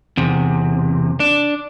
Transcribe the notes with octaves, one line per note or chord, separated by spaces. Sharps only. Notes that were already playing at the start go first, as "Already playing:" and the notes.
E2 C3
D4